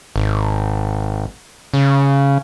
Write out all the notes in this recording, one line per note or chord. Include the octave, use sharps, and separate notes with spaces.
G#1
C#3